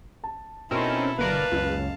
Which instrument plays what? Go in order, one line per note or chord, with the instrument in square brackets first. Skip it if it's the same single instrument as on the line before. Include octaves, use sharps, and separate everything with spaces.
[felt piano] A5
[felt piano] B2 [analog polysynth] C4 C#4 A#4 [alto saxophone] D#4 [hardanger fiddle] E4 A4
[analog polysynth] G1 A#4 D5 [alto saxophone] B4 [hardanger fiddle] F5 A5
[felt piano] F#1 [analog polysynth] C#2